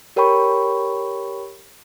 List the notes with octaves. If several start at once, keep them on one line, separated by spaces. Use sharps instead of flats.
G4 A#4 C#5 G5 B5 C#6